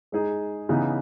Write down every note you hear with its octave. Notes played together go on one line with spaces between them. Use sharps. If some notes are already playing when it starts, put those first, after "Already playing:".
G#3 D#4 G#4
C#3 E3 B3 D#4